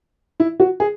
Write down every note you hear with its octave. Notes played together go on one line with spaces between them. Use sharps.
E4
F#4
G#4